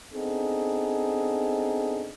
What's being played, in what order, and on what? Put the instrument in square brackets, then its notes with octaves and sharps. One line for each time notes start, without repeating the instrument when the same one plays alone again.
[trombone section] B3 C4 D4 D#4 G#4 A4